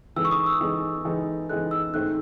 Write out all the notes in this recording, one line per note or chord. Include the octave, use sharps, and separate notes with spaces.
E3 G#3 D#4 A4 E6
C#6
D#6
E6
E3 G#3 D#4 A4
E3 G#3 D#4 A4
E3 G#3 D#4 A4 F#6
E6
G#2 D#3 A3 C4 D#4 F#6